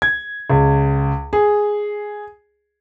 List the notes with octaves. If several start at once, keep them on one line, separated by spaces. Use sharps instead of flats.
G#6
C#2
G#4